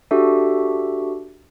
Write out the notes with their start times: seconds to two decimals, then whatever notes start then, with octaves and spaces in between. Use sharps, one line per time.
0.11 D4 F#4 G4 A4 E5